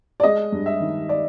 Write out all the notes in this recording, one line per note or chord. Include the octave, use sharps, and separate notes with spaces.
D5
G#3 D#5
G2
E5
D#3
D5